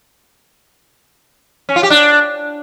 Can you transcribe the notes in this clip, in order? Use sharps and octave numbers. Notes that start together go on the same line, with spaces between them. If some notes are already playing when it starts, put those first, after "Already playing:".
C#4
F4
G4
D4